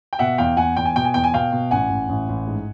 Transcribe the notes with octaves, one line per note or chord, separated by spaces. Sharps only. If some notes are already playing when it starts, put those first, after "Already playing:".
G5
B2 E5 F#5
E2 F5 G5
E2 F#5 G#5
E2 G5
G#5
B2 G5
G#5
E2 G5
G#5
B2 F5 G5
B2
A1 F#5 G#5
A1
A1
A1
G#2